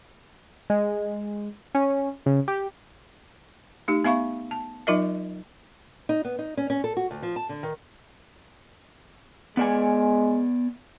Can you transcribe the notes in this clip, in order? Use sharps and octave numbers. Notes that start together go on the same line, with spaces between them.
G#3
C#4
C#3
G4
A3 D#4 G4
B3 E5 F5 B5 C#6
A5
F#3 D#4 F4 A#4 D#5 E5
D#4
B3
D#4
C#4
C#4
A4
F#4
D2
F3
A5
D3
D#3
G#3 B3 D5 G#5